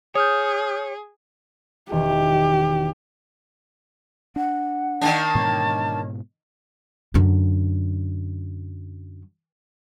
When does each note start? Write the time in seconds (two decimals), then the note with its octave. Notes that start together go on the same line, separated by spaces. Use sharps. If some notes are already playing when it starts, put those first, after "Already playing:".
0.15 G#4 C#5 D#6 F6 G6
1.92 E1 D#3 G4
4.36 D4 F#5
5.01 D#3 A#3 D4 A5
5.35 G#2 B2 E3 C#5
7.14 F#2 D3